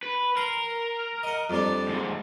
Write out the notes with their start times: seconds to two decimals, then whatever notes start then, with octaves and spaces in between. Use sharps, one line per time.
0.03 B4
0.37 A#4 C6
1.23 D#5 F#5
1.50 F2 G3 D4
1.88 D#2 G#2